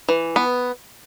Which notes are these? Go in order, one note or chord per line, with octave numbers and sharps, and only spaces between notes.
E3
B3